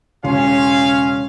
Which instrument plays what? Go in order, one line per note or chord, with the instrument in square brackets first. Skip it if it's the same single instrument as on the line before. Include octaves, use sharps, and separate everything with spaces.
[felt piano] E1 C#3 C6 [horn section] C#4 F5